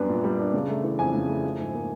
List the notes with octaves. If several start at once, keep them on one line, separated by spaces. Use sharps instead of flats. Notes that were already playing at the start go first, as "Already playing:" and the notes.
Already playing: F#2 G3 B3 D4
A#2
G3
D4
C#3
A3
E3
F2 G#5
C#3
A3
F3
G#2
A#3